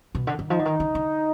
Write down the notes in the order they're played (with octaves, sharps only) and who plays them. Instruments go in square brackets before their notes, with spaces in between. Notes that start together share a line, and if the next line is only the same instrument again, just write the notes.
[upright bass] B2
D3
D#3
[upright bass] F3 [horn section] D#4
[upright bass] D3
D#3
D3
D3